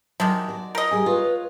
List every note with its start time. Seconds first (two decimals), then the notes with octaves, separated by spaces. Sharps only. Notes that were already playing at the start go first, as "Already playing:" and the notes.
0.20 D#3 F#3 G#3 D4
0.48 F#4 D5
0.75 A#4 D#5
0.91 G3 G#4 G#5
1.06 F4 B4 C#5